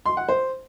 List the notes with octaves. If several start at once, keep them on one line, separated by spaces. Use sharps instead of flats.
C6
F#5
C5